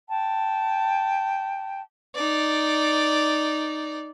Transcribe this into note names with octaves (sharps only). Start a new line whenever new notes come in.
G5 A5
D#4 D5